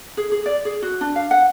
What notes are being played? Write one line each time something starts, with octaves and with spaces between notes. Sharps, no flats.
G#4
G#4
D5
G#4
F#4
D4
F5
F#5